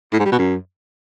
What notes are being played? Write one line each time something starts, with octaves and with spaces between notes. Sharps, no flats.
A2
G#2
G3
B2
F#2